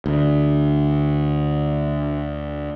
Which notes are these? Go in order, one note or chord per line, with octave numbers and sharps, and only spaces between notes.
D2 D3